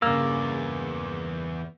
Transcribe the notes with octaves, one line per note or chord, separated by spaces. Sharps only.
E2 G2 C#3 A#3 D5 E6